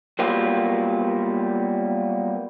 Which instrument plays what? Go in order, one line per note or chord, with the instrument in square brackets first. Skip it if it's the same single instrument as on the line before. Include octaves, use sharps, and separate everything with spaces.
[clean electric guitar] F#3 G3 A#3 B3 F4 G4